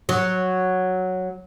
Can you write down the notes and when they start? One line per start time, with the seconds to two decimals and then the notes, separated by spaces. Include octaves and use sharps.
0.09 F#3